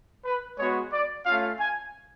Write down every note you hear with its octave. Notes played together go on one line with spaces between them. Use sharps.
B4
G#3 B3 F#4 C#5
D5
A3 C#4 F4 F5
G#5